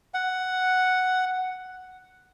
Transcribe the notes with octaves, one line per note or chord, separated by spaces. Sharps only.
F#5